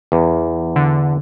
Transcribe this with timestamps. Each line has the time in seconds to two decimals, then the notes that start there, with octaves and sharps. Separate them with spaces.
0.12 E2
0.76 D3